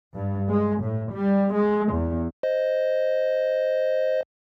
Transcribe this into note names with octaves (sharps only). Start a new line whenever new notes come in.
G2
G#3
A2
G3
G#3
E2
C5 D#5